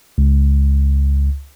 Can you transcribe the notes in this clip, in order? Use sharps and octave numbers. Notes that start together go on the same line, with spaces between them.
C#2